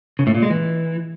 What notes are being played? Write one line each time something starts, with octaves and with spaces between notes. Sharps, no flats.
C#3
A2
A#2
G#3
E3